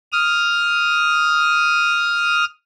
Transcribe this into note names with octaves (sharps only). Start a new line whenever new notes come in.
D#6 F6